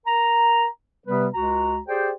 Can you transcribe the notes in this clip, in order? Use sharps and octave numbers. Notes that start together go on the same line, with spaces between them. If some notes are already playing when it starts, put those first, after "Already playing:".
A#4 A#5
C3 G3 B3 B4
C#2 G#3 F#4 A#5
G4 G#4 C5 D5 G5